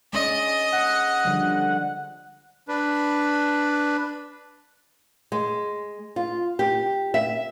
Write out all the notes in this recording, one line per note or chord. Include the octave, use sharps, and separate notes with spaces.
G#3 C#4 D5 D#5
F#5
D3 F3 G3
D4 B4
G#3
F4
G4
E5